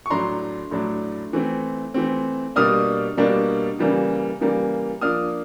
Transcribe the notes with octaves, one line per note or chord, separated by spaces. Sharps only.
C#6
A2 F#3 A3 D4 A#5 C6
A2 F#3 A3 D4
E3 A3 C4
E3 A3 C4
B2 G3 A#3 D4 D#6 F6
B2 G3 A#3 D4
C#3 E3 G3 A#3
C#3 E3 G3 A#3
F3 A#3 D4 D#6 F6